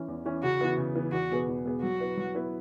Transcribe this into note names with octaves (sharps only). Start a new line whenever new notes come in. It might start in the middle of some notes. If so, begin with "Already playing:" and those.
Already playing: E3 C#4
E2
E3 C#4
C#3 F#4
E3 B3
C#3
E3 B3
E2 F#4
B2 B3 G#4 B4
E2
B2 B3 G#4 B4
F#3 F#4
B3 E4 B4
F#3
B3 E4 B4